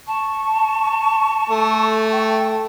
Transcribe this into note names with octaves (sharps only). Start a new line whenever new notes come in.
A5 C#6
A3
G5